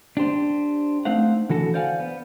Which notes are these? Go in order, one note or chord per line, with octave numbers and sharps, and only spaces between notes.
D4 G4 C5
A3 C4 D#4 C5 F5 F#5
D3 E3 F#4 A4
C5 D5 F5 F#5 G#5
B3